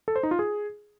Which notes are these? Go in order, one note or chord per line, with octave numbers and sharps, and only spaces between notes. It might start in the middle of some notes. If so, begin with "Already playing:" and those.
A4
C5
D#4
F4
G#4